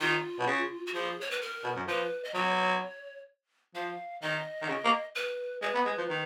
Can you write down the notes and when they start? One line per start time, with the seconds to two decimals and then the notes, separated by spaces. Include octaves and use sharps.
0.01 D#3 F4
0.39 B2
0.47 C#3
0.87 F#4
0.94 F3 G#4
1.21 C#5
1.31 B4
1.42 A#4
1.64 B2
1.76 F#2
1.87 F3 B4
2.25 D#5
2.34 F#3 C#5
3.75 F3 F5
4.22 D#3 D#5
4.61 D#3
4.68 C#3
4.84 A#3
5.15 B4
5.62 G#3 B4
5.74 B3
5.86 G#3
5.98 F3
6.09 D#3